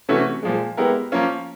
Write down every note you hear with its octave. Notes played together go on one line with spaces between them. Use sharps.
C3 E3 A3 C#4 F#4
A#2 F3 G#3
G#3 B3 E4 G4 A#4
F3 A#3 C#4 F4